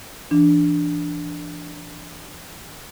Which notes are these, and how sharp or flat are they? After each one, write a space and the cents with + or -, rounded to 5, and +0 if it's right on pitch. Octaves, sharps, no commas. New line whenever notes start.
E3 +35 D4 +0